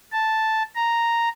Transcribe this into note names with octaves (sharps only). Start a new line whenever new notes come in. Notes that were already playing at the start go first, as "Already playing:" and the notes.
A5
A#5